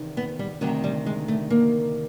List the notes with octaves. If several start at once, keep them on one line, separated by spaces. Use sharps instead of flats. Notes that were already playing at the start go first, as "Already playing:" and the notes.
Already playing: E2 C3 D#3
B3
G3
D2 C3 D#3 F#3
G3
G#3
A3
A#3